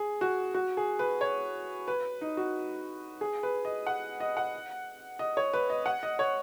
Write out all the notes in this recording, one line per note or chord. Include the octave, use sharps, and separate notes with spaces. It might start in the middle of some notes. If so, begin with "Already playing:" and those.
Already playing: G#4
F#4
F#4
G#4
B4
C#5
B4
D#4
F#4
G#4
B4
D#5
F#5
D#5
F#5
D#5
C#5
B4
D#5
F#5
D#5
C#5